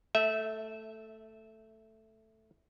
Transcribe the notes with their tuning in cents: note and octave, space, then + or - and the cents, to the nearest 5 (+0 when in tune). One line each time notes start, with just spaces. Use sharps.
A3 +0 E5 -15